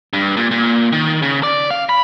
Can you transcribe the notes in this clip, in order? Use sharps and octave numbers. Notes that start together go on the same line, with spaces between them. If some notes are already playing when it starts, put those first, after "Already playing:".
G2
A#2
A#2
D#3
C#3
D5
F5
B5